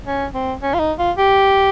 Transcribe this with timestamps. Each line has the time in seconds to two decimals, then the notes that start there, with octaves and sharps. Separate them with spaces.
0.07 C#4
0.34 C4
0.62 C#4
0.74 F4
0.80 D#4
0.99 F4
1.17 G4